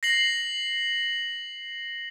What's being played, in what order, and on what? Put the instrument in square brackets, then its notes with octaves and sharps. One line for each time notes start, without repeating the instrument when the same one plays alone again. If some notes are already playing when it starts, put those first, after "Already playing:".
[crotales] A#6 C7 F#7